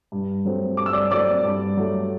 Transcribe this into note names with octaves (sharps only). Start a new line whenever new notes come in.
G2
F#3 A3 C4
G2 D6
E6
D5 D6
F#3 A3 C4 D5 D6
G2
F#3 A3